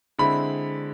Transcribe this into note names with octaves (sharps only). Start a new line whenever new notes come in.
D3 G#3 C4 E4 B5